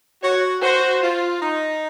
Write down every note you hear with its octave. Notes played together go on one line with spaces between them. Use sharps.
F#4 C#5
F#4 C5
F4
D#4